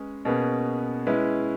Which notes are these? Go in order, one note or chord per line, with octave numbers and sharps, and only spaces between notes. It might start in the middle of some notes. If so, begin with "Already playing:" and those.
Already playing: G#3 C#4 G#4 B4
B2 A#3 C#4 G#4 B4
G#3 C#4 E4 B4